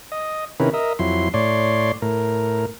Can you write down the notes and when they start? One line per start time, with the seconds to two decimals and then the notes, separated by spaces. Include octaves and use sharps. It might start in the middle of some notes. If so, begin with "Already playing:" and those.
0.12 D#5
0.60 C3 D#3 C#4 E4 A#4 B4
0.73 A#4 D#5 E5
0.99 F2 F#3 E4 C6
1.34 A2 C#5 D5 C6
2.02 A2 A#4